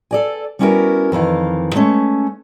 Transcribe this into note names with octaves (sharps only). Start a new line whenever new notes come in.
A4 D5 G#5
G3 B3 C#4 E4 F#4 A#4
F2 D#3 E3 F5
G#3 A3 C#4